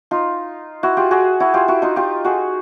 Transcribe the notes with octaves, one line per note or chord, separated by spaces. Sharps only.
D#4 F4
E4 F#4
F4 G4
F#4 G#4
E4 F#4
F4 G4
E4 F#4
D#4 F4
F4 G4
F#4 G#4